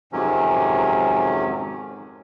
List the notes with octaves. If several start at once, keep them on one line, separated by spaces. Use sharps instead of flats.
F2 G#2 C3 D#3 F#3 C#4